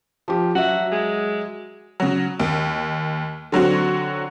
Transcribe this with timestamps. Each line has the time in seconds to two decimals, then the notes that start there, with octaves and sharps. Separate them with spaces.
0.28 F3 G4
0.55 F#3 F#4 E5
0.92 G#3
2.00 C#3 F#3
2.40 D#2
3.52 D3 F#3 C4 F#4